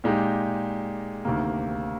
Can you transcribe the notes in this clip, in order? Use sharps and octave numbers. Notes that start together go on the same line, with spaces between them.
A#2 G#3 D#4 G4
D2 C3 D#3 A#3